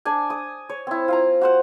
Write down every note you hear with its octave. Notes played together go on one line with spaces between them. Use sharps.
D4 D5 G#5
D#6
C#5
C4 E4
F4 F5 A#5
F#4 C5 F#5